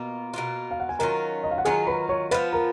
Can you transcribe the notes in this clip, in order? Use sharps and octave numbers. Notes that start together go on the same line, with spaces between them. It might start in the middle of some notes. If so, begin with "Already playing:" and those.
Already playing: B2 A#3 F4
B2 A#3 F4
F5
F#5
G#5
D#3 F#3 C#4 F4 A#4 A#5
D#5
F5
F#5
D#3 F#3 C#4 F4 G#4 G#5
B4 B5
C#5 C#6
F3 B3 F4 B4 B5
A#4 A#5